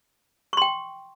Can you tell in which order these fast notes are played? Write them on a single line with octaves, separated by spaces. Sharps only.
C#6 C6 G5